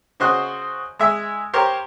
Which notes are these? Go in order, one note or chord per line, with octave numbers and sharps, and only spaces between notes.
C#3 F#4 C5 D#5 F#6
G#3 E5
G4 A#4 C5 C#5 A#5